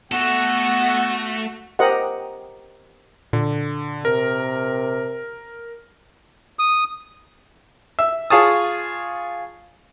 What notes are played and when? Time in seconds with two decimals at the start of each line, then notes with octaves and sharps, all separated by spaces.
0.12 A3 B3 F#4 A4 F#5
1.79 G4 A#4 C5 D#5 F#5
3.33 A#2 D3
4.05 C3 A#4
6.59 D#6
7.99 E5
8.30 F4 G#4 C#5 A5 D#6